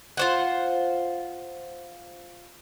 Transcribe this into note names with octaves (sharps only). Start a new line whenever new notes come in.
F4 C5 F#5